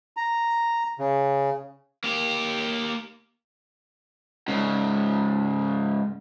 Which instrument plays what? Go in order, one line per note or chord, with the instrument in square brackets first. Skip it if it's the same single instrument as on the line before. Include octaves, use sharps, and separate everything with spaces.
[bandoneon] A#5
C#3
[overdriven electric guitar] A#3 G4
G#2 C#3